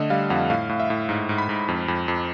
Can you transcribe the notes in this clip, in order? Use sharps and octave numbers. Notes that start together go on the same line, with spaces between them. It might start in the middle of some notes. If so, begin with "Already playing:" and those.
Already playing: D3 A3 D#5
G3 F5
F2 F#5
A2 F5
A2
E5
A2
G#2
G#2
B5
G#2
F2
F2
F2